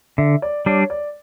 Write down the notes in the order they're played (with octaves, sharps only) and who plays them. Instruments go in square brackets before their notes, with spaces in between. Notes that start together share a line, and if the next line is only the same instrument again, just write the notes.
[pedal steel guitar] D3 [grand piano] E5
[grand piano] D5
[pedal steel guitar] G3 D4 [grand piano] C#5
[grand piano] D5